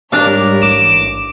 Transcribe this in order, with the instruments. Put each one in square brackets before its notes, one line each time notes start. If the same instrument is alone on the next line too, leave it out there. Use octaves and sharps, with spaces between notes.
[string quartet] G#2 A#4 C#5 [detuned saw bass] G3 [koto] D4 F5
[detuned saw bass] A1 [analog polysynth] D6 E7